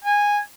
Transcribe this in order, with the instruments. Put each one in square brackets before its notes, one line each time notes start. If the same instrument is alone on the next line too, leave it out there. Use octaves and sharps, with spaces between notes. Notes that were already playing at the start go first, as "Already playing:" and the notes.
[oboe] G#5